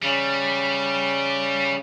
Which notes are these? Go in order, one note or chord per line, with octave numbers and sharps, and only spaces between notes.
C#3 G3